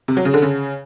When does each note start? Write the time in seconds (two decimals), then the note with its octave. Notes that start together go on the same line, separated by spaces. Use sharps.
0.08 C3
0.17 F#3
0.25 C#3
0.34 D3
0.42 C#3